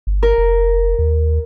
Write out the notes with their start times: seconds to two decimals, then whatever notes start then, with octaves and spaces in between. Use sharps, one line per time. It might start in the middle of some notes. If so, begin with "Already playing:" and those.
0.07 G1
0.23 A#4
0.38 F1
0.99 D#2